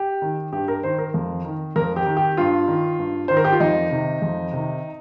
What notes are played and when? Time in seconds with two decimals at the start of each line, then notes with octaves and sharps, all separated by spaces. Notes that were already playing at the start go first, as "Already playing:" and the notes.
Already playing: G4
0.22 D#3
0.52 G2 G4
0.68 A#4
0.83 D#3 C5
0.98 A#4
1.14 F2
1.45 D#3
1.76 F2 A#4
1.96 G4
2.06 D#3
2.17 G4
2.37 G2 F4
2.68 D#3
2.99 G2
3.28 D#3 C5
3.37 A#4
3.44 G4
3.52 F4
3.60 F2 D#4
3.91 C3 D#3
4.22 F2
4.53 C3 D#3